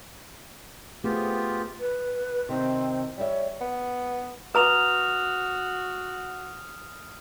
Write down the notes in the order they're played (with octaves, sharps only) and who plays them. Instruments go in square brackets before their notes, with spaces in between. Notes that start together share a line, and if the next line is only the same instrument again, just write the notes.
[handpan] A3 C4 G#4 [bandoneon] B3 F4 G4
[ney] B4
[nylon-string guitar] C3 D#3 [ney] C4
[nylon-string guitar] G3 E5 [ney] C#5
[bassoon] B3
[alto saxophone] F#4 [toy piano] B4 A#5 D6 [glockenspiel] D#6 F6 F7